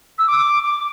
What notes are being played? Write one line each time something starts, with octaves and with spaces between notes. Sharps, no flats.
E6
D6
D6